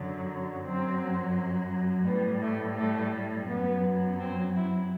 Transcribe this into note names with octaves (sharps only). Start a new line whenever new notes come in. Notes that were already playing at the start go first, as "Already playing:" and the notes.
Already playing: F#2 D3 F#3
F#2 F#3 C4
A2 G3 B3
A3
A3
F#2 F#3 B3
C4
E4